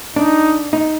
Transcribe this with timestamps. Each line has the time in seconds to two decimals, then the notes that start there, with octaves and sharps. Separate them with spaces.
0.16 D4 D#4
0.73 D#4